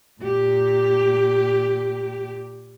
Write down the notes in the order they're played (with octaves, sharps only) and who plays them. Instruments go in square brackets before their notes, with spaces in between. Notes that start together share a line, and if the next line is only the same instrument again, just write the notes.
[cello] A#2 G4